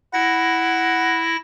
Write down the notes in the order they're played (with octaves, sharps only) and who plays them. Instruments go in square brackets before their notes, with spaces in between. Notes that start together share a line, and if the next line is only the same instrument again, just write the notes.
[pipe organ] E4 A#6 [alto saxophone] F#5